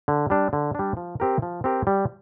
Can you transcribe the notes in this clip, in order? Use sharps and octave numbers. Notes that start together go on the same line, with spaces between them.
D3
G3 D4
D3
G3 D4
F3
C4 G4 A#4
F3
C4 G4 A#4
G3